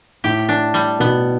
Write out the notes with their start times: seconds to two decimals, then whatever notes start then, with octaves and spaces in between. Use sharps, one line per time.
0.24 A2 G4
0.49 D4
0.74 G3
1.00 B2 B3